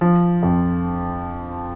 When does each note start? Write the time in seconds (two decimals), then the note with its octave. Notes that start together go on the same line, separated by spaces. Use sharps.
0.01 F3
0.43 F2